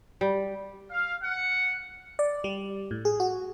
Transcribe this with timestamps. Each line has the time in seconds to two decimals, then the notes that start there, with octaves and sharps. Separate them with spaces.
0.21 G3
0.89 F5
1.22 F#5
2.19 D5
2.44 G3
2.91 A2
3.05 G#4
3.20 F#4